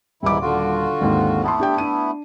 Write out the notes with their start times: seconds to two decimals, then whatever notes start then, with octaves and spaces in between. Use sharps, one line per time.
0.23 D#1 G#2 E3 G3 E4 D6
0.42 D3 F4 F#4
1.01 G#1 D#2 G#2
1.43 A3 B3 E4 F#5 A5 C6
1.59 D4 G4 G5
1.78 D4 D#7